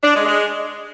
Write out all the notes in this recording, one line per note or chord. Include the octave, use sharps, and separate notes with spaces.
D4
G#3
G#3